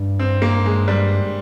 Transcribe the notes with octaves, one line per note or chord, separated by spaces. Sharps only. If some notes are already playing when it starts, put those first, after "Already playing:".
Already playing: G2
C4
A#3
G#3
G3